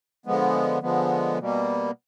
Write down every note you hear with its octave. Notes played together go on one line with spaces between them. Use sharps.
D3 F3 G#3 B3
D3 F3 G#3 B3
B2 G3 A#3